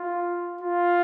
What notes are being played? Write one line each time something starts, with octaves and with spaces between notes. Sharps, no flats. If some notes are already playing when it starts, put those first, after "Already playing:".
Already playing: F4
F4